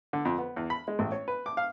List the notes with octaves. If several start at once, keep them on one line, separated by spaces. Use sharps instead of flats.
D3
F2
B3
E2
B5
G#3
A1
C#5
B4
D6
F5